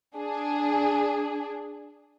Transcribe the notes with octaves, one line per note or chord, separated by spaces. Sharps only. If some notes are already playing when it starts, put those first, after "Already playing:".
D4 G#4